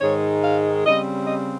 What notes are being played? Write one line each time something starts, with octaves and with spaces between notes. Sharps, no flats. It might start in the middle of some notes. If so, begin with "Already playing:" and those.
G#2 D#3 G#3 C#5
F5
C#3 G3 C4 D#5
D#5